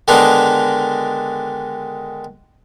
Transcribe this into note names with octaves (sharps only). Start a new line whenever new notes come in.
D3 D#3 G#3 B3 D4 D#4